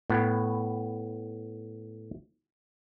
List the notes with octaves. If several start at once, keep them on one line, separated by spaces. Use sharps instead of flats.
A2 B3